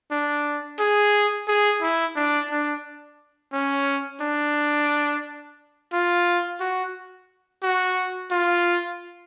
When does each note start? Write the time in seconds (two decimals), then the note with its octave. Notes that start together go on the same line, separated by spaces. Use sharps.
0.11 D4
0.79 G#4
1.48 G#4
1.82 E4
2.16 D4
2.50 D4
3.53 C#4
4.21 D4
5.93 F4
6.60 F#4
7.63 F#4
8.31 F4